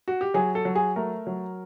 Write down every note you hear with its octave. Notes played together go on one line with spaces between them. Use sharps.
F#4
G4
F#3 G#4
A4
F#3
G#4
A3 A#4
F#3